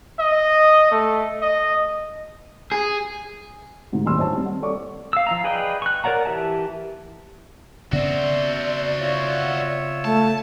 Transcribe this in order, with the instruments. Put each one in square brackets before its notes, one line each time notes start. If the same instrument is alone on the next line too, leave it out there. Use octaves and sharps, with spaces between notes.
[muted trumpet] D#5
A3
D#5
[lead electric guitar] G#4
[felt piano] D2 G#2 C3
D#1 G#1 F#3 B5 C6 E6
C5 C#5 A5
G3 C4
F#5
A4 C#5 D5 C#6 D6
[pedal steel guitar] F5 E6
F3 F5 A#5
G#4 B4 D5 D#5 G5
C#6 F#6
A#4 C#5 D5 F#5 A#5
E3 G4 E5 A5
[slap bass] C#3 B3 C4 [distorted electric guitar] F#4 C5 [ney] D5 [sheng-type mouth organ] E5
[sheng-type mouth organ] F4 C#5 E5
[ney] A3 [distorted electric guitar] A5